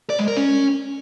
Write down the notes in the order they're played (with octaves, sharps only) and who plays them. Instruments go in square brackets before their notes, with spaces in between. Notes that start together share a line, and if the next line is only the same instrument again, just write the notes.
[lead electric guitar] D5
G#3
A#4
C#4